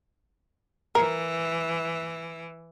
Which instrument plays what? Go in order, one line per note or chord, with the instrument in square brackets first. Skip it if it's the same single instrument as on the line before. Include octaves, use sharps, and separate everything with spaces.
[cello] E3 [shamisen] A#4